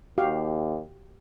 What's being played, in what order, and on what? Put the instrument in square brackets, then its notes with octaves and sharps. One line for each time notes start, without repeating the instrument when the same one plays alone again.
[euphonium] D#2 [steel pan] F#4 G4 F5